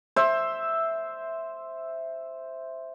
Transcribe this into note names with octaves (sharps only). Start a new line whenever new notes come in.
C5 E5